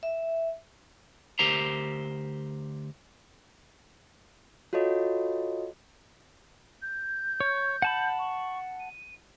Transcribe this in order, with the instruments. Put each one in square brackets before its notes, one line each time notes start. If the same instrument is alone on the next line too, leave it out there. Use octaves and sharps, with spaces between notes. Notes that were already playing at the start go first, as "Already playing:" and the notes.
[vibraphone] E5
[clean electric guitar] D2 G4 A#4 C5 A#5
[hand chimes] F4 F#4 A4 C#5 D#5
[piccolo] G6
[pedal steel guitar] C#5
F#5 A5 B5
[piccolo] C#6
D#7